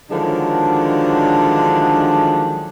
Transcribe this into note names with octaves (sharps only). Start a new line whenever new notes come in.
D3 D#3 F3 F#3 G#3 D4